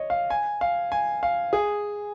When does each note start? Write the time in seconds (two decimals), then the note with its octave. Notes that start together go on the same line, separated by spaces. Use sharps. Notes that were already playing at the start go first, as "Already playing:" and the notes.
Already playing: C#5 D#5
0.10 F5
0.30 G#5
0.61 F5
0.92 G#5
1.23 F5
1.53 G#4